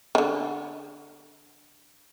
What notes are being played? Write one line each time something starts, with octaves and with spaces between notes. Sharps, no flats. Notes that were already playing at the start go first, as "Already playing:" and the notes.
D3 D#3